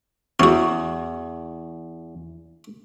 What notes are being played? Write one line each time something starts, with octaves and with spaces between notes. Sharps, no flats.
E2 C#4 F#4